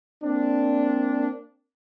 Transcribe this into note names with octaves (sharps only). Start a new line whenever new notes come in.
A#3 C4 D4